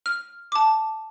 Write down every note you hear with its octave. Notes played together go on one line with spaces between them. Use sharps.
F6
A5 D6